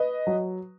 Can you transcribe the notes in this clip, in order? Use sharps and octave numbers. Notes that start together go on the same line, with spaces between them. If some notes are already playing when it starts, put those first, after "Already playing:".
Already playing: B4 D#5
F#3